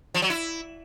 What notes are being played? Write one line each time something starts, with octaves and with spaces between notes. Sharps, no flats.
F3
F#3
E4